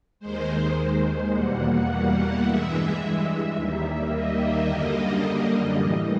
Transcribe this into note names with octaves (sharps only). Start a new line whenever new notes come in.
D#2 D#3 G#3 C5
E2 B2 G3 A#3 F#5
F#5
G2 E3 G#3 E5
D#2 D#3 G3 A#3
D#5
F#2 D3 G3 A#3
A2 E3 G3